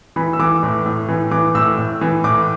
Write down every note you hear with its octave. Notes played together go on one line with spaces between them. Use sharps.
E3 B5
E6
E3 D6
A2
A2
E3
E3 D6
A2 E6
A2
E3
A2 D6